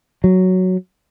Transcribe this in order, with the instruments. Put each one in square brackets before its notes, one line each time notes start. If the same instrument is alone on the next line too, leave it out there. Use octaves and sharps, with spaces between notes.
[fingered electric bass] F#3